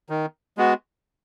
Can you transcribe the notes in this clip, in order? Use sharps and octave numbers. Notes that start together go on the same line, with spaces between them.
D#3
G#3 B3 F#4